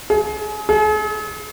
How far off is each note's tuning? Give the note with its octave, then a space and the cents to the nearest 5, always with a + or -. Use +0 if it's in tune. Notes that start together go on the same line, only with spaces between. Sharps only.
G#4 +35
G#4 +45